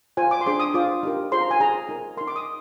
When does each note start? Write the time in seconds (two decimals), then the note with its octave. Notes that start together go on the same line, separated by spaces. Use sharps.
0.17 F4 C5 G#5
0.31 D6
0.41 C6
0.46 D4 G#4 C5 D6
0.60 D#6
0.74 F4 C5 D6
1.03 D#4 G4 A#4
1.32 F4 G#4 C5 C6
1.41 A#5
1.51 G#5
1.60 D#4 G#4 C5 A#5
1.89 D#4 A#4
2.17 A#4 C6
2.21 D#4
2.28 D6
2.36 D#6